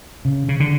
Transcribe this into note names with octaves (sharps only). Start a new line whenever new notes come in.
C#3
C#3
D3